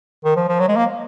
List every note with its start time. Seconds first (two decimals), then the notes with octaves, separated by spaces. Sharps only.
0.25 D#3
0.36 F3
0.48 F3
0.60 F#3
0.69 G#3
0.77 A#3